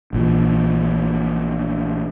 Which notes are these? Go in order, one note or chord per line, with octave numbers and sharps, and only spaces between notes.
A#1 A#2 E3